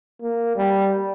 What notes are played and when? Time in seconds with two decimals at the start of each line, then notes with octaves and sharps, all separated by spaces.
0.21 A#3
0.56 G3